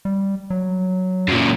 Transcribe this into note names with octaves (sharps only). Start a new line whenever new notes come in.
G3
F#3
F#2 A#2